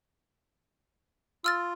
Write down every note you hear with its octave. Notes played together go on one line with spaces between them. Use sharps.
F4 E6 F6 A6